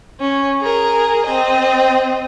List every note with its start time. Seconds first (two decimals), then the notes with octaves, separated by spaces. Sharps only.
0.20 C#4
0.61 G#4 A#4
1.26 C4 D#5